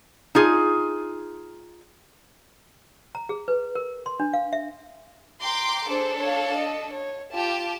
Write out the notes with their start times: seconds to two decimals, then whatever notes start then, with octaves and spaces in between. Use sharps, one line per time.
0.35 D#4 F4 G#4
3.15 A#5
3.29 G#4
3.48 B4
3.75 A#4
4.06 C6
4.20 D4
4.33 F5
4.53 E5
5.42 G5 A#5 C6 D6
5.87 D4 G#4 A4 C5
6.19 C#5 F5
6.58 D#5
6.94 C#5
7.33 F4 G4 A5